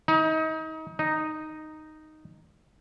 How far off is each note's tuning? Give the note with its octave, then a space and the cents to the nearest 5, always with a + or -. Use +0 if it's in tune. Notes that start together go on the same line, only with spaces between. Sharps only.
D#4 +30
D#4 -5